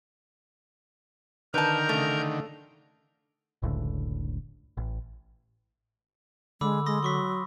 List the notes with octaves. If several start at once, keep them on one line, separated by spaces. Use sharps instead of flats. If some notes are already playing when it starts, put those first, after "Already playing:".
D3 D#3 A#4 B4 A5 A#5 G6
C#3 A3
F#1 C#2 A2 D3
A1
D3 G#3 B5 D6 E6
G#3 C6 D#6 A#6
F#3 C6 C#6 B6